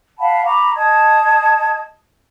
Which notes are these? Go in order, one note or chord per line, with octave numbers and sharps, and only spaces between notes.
F5 F#5 A5 B5
A#5 B5 C#6 D6
D#5 A5 D#6 G#6